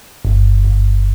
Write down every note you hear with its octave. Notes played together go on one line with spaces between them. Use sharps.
G1
G1